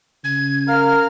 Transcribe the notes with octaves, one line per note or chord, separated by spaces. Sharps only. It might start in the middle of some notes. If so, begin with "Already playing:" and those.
C#3 G#6
A#4 F5 F6